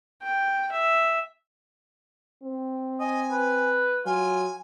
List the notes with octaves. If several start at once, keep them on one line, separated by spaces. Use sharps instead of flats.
G5
E5
C4
D#5 G#5
B4
F#3 F4 G#5